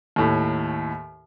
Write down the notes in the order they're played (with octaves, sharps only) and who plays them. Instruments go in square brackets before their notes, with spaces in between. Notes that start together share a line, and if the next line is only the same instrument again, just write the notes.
[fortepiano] D#2 A2